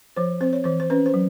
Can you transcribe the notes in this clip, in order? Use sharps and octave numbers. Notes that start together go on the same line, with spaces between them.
F3 C5
C4 C5
C#5
E3 C5
C5
C#4 B4
C5
F#3